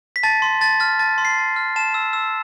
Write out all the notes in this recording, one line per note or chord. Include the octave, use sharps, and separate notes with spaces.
B6
A5 A6
C6
A5 A6
F6 A6
A5 A6
C6
C7
A5
F6
A5 E7
E6
E6